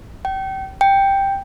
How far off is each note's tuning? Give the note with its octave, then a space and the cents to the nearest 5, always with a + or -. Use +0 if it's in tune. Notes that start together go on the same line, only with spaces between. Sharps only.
G5 -30
G5 +5